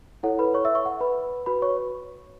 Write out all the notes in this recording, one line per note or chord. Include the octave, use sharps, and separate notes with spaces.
E4 A4 C#5 F#5
B4 B5
C#5 C#6
E5 E6
C#5 C#6
F#5
B4 B5
F#4 B4 B5
C#5 C#6